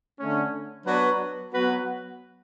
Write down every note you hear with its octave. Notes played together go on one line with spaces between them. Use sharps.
D3 A3 C#4
F#3 B3 D4 F#4 B4
F#3 B3 F#4 B4